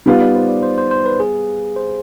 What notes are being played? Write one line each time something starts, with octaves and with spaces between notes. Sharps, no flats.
G3 B3 D#4 F4
D5
C5
D5
C5
C5
C5
B4
G#4
C5